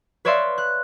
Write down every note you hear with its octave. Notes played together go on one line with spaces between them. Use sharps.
B4 C#5 D5 E5 F5 C6
F#6